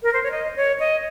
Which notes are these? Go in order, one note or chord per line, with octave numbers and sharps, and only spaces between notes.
A#4
C5
C#5
D#5
C#5
D#5